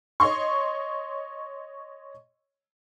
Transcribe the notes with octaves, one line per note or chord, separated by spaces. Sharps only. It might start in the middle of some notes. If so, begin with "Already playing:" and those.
C#5 D#5 C6 C#6